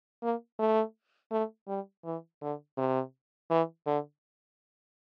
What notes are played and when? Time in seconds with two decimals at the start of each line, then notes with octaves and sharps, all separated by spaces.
0.23 A#3
0.59 A3
1.32 A3
1.68 G3
2.05 E3
2.42 D3
2.78 C3
3.51 E3
3.87 D3